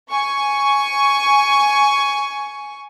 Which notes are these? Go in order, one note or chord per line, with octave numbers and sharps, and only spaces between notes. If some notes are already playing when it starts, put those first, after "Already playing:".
G#5 C#6